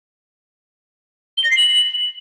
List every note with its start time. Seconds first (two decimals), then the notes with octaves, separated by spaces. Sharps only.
1.37 G7
1.44 A#6
1.50 C7
1.57 F#7